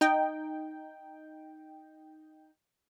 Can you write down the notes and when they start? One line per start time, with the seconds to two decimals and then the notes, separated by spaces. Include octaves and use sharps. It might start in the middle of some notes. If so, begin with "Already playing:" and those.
0.01 D#4 G5